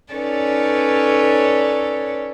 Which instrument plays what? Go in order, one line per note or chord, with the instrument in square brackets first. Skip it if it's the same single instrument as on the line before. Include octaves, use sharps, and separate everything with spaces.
[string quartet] C#4 D#4 A4 B4 C#5 D5